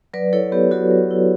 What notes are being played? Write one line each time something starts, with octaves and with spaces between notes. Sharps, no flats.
F#3 B4 D5
E4 A4 C#5
B3 G4 B4
F#3 F#4 A4
F#3
E4